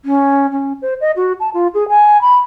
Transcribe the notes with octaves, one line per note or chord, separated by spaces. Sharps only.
C#4
C#4
C5
D#5
F#4
A5
F4
G#4
G#5
B5